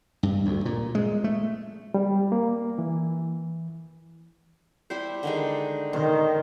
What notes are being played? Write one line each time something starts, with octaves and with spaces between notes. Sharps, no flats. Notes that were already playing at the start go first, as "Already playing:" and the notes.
G2
D2
A#2
G#3
A3
G3
A#3
E3
G3 E4 C5
D3 D#3 G#3
D#3 C5